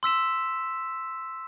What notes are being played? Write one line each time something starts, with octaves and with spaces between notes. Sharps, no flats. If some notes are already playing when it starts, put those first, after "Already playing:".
C6 E6 B6 E7